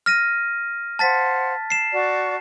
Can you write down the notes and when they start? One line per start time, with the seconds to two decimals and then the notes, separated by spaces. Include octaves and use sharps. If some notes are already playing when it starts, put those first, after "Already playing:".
0.06 F6 A#6 D#7
0.99 C5 F5 F#5 A5 A6 B6
1.70 C7 E7
1.93 F#4 D5 C#6